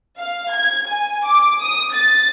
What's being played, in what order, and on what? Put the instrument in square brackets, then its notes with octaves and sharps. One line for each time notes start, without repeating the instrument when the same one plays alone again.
[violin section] F5
G#6
G#5
D6
D#6
A6